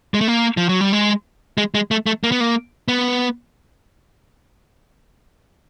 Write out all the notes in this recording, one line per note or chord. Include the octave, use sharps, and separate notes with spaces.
G#3
A3
A#3
F3
F#3
G3
G#3
G#3
G#3
A3
A3
A#3
B3
A#3
B3